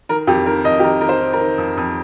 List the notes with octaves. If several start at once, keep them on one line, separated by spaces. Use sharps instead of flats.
D#3 A#4
F2 G4
D#3 A#4
F2 D#5
G4
D#3 A#4
D#3 A#4
C5
D#3
A#4
D#3
F2
F2